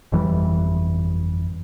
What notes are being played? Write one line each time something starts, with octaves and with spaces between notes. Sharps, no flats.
G1 F2 E3 G3